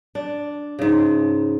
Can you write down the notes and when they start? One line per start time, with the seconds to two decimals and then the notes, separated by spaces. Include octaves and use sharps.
0.15 D4
0.79 G#2 C#3